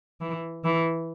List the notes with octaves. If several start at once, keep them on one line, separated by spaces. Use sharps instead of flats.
E3
E3